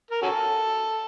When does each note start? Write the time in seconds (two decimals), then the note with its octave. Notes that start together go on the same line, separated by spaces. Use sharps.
0.11 A#4
0.22 C#4 F#4 A4